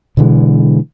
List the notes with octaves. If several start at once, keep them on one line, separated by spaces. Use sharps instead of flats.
B2 D3 E3 G#3